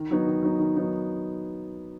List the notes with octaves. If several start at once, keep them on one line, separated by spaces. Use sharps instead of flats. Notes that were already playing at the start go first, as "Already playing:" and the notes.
Already playing: D#3
F#3 B3 D#4
D#3
F#3 B3 D#4
D#3
F#3 B3 D#4